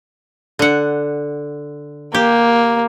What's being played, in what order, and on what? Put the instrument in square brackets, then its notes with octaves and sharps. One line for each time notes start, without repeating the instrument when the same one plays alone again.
[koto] D3 F#5
[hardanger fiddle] A#3 [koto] G4